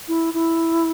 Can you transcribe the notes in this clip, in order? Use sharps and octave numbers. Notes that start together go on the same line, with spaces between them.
E4
E4